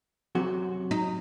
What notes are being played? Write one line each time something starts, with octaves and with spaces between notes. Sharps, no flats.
F#2 C3 F#4
D#4